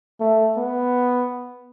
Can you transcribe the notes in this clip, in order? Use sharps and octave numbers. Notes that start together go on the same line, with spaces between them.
A3
B3